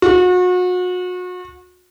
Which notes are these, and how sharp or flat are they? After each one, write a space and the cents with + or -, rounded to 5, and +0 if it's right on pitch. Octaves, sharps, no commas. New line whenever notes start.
F#4 -35